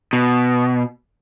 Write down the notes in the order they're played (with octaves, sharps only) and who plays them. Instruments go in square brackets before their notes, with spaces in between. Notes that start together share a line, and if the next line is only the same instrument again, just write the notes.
[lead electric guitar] B2